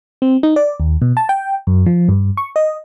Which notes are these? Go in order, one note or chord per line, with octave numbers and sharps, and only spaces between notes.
C4
D#4
D5
D#2
B2
A5
G5
F#2
F3
G2
C#6
D#5